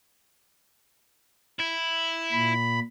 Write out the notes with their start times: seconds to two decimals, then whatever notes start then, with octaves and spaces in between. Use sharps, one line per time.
1.60 E4
2.32 A#2 B5